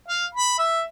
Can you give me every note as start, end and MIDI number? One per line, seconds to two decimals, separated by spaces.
0.08 0.26 77
0.35 0.54 83
0.58 0.83 76